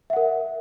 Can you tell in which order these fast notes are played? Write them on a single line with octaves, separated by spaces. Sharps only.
E5 F#5 A#4